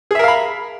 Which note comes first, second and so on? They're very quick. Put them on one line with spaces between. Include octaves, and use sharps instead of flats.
G#4 E5 A#4 F5 B5